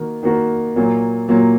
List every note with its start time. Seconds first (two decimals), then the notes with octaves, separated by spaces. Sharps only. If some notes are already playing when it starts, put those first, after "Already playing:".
Already playing: D#3 A#3 F#4 A#4
0.23 D#3 A#3 F#4 A#4
0.76 A#2 F#3 A#3
1.28 A#2 F#3 A#3